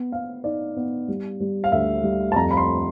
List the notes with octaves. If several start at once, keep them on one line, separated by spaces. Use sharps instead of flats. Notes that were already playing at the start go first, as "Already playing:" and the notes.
Already playing: B3
B3 F5
D#4 D5
B3
G3
G3
F5
D2 E5
G3
A5
F2 A#5
B5
C6